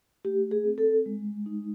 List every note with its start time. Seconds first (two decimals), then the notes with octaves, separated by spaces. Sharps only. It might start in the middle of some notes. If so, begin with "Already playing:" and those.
0.24 A3 G4
0.51 G#4
0.64 C4
0.78 A4
1.06 G#3
1.46 D#4